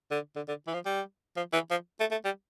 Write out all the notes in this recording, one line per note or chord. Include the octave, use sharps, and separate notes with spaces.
D3
D3
D3
E3
F3
G3
F3
E3
F3
A3
A3
G3